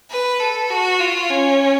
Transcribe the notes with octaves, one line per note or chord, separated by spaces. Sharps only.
B4
A4
F#4
F4
C#4